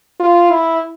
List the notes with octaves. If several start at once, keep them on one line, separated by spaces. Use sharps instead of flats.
F4
E4